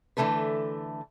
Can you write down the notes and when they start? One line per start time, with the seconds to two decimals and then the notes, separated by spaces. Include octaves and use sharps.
0.17 D3 E3 F3 A3 A4 B4